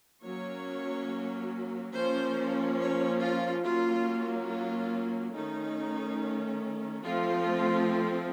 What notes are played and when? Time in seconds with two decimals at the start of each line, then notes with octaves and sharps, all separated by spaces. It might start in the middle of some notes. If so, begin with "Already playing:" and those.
0.24 F#3 A#3 C#4 C#5
1.95 F3 A#3 C#4 C5
2.79 C#5
3.22 F4
3.65 F#3 A#3 C#4 F4
4.48 F4
5.34 D#3 A3 C#4 D#4
7.04 F3 A3 C4 F4